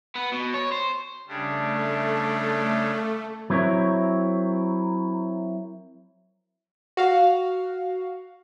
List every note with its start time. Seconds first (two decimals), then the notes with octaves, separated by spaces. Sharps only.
0.15 B3
0.32 B2
0.54 C#5
0.72 C5
1.28 C#3 G3 A3 D4
3.50 F#3 C4 E4 A#4 C#5
6.97 F#4 F5